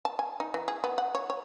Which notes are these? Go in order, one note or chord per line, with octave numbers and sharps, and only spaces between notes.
A5
G#5
D#4
E3
G#4
B3
F#5
C#5
C#5